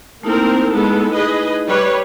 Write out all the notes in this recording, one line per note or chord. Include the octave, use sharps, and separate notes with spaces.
A3 A#3 C4 D#4 E4 A#4
G#3 B3 A4
G#4 B4 D#5
G3 B4 C#5